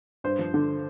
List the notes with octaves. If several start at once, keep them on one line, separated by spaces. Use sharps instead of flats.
G2 C5
F3
D3